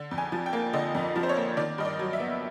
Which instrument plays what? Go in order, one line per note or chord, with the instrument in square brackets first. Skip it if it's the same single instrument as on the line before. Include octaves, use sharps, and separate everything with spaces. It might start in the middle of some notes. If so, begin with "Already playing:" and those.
Already playing: [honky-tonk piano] D3
F2
G#5
F3
G5
A#3
D3 D#5
F2
F3
C5
C#5
A#3
D#3 D5
G2 D#5
D5
F#3
E5
B3